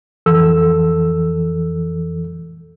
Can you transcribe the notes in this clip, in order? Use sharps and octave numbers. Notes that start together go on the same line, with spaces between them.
F2 E3 A4 E6